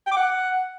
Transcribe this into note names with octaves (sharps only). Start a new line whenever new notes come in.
G5
D6
F#5